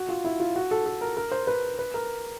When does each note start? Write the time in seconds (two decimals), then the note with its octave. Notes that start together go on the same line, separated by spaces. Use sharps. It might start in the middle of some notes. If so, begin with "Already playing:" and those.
Already playing: F#4
0.09 F4
0.24 E4
0.40 F4
0.56 F#4
0.71 A4
0.86 A4
1.01 A#4
1.17 A#4
1.32 C5
1.47 B4
1.79 B4
1.94 A#4